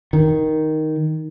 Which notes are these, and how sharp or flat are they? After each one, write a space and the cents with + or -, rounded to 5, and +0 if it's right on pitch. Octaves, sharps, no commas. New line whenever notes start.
D#3 +5